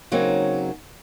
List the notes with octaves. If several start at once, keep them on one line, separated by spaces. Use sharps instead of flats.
C#3 F#3 A#3 C4 D#4